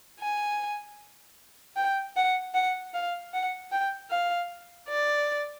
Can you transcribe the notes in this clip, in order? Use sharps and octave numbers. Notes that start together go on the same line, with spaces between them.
G#5
G5
F#5
F#5
F5
F#5
G5
F5
D5